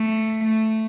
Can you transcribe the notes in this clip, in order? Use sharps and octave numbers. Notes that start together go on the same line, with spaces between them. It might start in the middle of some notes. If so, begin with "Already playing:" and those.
Already playing: A3
A3